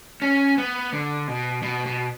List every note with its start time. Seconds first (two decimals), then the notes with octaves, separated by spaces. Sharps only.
0.22 C#4
0.58 B3
0.93 D3
1.28 B2
1.63 B2
1.86 B2